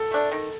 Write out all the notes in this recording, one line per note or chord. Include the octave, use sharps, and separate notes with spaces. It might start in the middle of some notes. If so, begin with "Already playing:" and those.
Already playing: A4
A3 D4
D#3